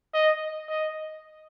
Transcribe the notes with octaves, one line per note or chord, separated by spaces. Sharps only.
D#5
D#5